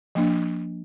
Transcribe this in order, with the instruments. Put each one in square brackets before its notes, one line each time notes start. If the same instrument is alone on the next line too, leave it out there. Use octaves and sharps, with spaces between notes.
[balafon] F3 A#3 D4